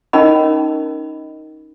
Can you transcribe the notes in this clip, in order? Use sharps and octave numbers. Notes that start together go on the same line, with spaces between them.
C#4 D#4 A#4 D#5 B5